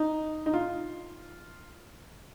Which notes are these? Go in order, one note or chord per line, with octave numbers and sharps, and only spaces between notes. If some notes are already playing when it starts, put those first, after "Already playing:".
Already playing: D#4
D#4
F4